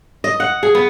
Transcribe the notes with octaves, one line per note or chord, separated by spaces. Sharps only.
D#5
F#5
G#4
B3